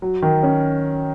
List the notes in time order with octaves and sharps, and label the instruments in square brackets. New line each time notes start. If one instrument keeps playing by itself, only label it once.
[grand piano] F#3
D#3
C#4